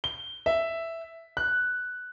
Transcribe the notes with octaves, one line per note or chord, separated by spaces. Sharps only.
G7
E5
F#6